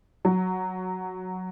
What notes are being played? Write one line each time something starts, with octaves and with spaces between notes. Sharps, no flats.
F#3